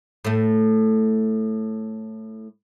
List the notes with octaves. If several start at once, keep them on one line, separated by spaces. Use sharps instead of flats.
A2 A3